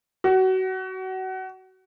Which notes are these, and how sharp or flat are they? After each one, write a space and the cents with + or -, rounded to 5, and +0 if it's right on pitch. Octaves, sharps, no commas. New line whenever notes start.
F#4 +25